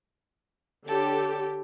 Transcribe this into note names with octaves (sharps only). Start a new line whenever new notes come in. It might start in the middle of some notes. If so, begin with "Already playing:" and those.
D3 G4 A4 C#5